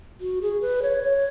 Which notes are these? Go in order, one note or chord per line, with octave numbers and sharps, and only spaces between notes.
F#4
G#4
B4
C#5
C#5